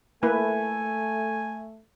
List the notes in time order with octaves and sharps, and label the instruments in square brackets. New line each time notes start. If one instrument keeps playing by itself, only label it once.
[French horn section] A3 [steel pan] A#3 E4 B4 [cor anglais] G#5